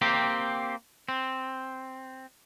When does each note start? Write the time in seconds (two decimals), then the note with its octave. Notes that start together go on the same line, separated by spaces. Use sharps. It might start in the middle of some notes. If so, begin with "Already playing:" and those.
0.02 A#3 C4 G4
1.09 C4